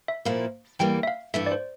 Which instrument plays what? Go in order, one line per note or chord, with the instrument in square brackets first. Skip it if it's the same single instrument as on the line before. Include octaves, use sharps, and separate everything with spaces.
[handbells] E5
[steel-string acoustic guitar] A#2 F3 A#3 E4 [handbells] F5
[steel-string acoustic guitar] E2 E3 G3 A#3 [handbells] G5
[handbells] E5
F5
[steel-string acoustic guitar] G2 E3 A3 E4 [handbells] E5
[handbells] D5
C5